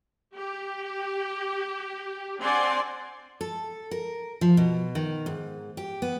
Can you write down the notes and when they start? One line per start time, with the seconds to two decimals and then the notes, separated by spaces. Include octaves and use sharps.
0.35 G4
2.41 C4 D4 D5 F#5 G#5 C6
3.41 A4
3.91 A#4
4.41 F3
4.57 B2
4.95 D#3
5.26 G#2
5.77 G4
6.02 B3